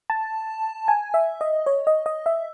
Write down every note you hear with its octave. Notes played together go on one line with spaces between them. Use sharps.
A5
G#5
E5
D#5
C#5
D#5
D#5
E5